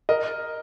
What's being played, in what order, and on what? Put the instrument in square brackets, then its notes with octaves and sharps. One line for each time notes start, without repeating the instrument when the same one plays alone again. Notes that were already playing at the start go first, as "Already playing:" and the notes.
[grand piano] A#4 D#5